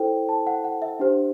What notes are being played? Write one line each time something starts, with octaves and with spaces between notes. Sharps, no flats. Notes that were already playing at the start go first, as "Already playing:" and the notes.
Already playing: E4 A4 C5 G5
A5
F#5
F#5
E5
D4 G4 C5